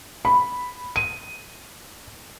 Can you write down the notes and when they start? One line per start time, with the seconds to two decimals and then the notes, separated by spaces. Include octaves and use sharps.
0.25 B5
0.96 D#7